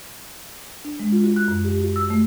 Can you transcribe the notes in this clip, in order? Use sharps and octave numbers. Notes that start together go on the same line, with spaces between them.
D4
G#3
F4
F#4
F#6
F#2
G4
F#4
E6
A3